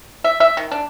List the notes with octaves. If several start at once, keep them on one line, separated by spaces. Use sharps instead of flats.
E5
E5
D#3
D4